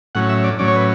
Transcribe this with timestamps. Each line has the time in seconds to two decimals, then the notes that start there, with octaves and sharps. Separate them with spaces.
0.15 A2 F#3 C#4 F#5
0.29 E5
0.44 D5
0.59 A2 F#3 C#4 D5
0.68 C#5
0.76 B4